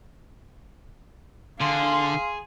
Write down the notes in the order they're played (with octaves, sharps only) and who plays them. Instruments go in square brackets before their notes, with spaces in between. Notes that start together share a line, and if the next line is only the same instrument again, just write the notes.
[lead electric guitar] D3 [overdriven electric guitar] G#4 [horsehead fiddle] F5 [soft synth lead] C6